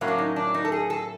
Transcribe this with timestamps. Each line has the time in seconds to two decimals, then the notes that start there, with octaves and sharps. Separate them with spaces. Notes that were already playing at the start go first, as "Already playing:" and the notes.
0.01 A2 F#3 A#3 C#4
0.08 D4
0.18 D#4
0.36 D4
0.54 D#4
0.65 A4
0.72 G#4
0.90 A4